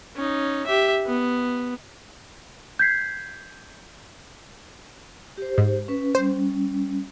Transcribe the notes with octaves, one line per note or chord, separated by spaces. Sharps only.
C#4 D#4
G4 E5
B3
G6 G#6 B6 C7
G4 C5
G#2
C#4 B4
G3 C#4 C5